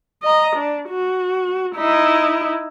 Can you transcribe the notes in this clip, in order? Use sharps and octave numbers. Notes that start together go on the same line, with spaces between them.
D#5 A#5
D4
F#4
D#4 E4